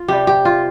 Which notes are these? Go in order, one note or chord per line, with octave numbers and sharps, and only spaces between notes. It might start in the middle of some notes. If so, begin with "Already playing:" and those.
Already playing: F4
C3 G3 G4
G4
F4